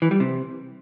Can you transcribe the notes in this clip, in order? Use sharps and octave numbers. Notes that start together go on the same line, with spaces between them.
E3
G3
C3